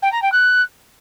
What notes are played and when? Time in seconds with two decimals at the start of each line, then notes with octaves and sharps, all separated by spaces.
0.02 G5
0.12 A#5
0.22 G5
0.32 F#6